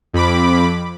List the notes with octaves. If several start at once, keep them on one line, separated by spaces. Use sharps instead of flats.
F2 B5 D6